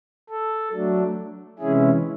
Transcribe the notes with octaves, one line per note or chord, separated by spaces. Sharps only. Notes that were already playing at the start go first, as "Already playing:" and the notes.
A4
F#3 A3 D4
C3 E3 G#3 C#4 E4 G#4